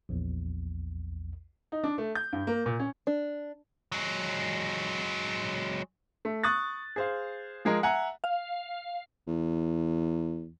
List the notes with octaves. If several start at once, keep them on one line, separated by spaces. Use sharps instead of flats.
A#1 E2
D#4
D4
A3
G6
G2
A#3
A#2
C#4
D4
F#3 G#3
A3
C#6 D#6 F#6 A6
G#4 C5 F5
F3 G#3 G#4 A#4 D#5
E5 F#5 G#5 A#5
F5
E2